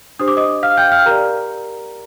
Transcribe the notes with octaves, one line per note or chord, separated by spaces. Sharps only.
D4 G4 C5 D#6
D6
D#5 D#6
F5 F6
G5 G6
F5 F6
G4 A#4 D5 A#5